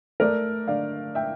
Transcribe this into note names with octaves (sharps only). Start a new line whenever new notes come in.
A3 A#4 D5
D3 D5 F5
E5 G5